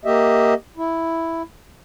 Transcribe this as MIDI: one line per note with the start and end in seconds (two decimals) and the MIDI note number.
0.05 0.54 58
0.05 0.54 67
0.05 0.54 75
0.05 0.54 76
0.77 1.42 64